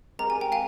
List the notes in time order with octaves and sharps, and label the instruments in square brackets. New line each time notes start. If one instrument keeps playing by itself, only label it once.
[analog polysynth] G#3 C4 G4 A#4 [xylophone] A#5
[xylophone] G#5
G5
F5 G#5